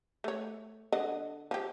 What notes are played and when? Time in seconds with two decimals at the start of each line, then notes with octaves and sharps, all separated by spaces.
0.24 A3 C#5
0.92 D3 D#5
1.51 F3 G4